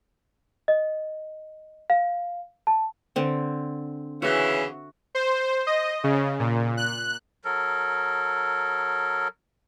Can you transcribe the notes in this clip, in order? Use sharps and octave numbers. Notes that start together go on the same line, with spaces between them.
D#5
F5
A5
D3 C4
C#3 E3 F#4 E5
C5
D#5
C#3
A#2
F#6
F#3 A4 A#4